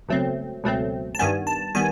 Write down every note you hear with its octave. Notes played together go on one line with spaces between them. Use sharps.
C#2 B2 F#3 A3 C4
C#2 B2 F#3 A3 C4
A5
G2 D#3 G3 B3 G#5
A5
D#3 G3 B3 G#5